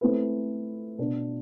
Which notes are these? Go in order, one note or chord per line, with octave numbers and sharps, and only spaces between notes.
A3 C4 E4 B4
B2 B3 D4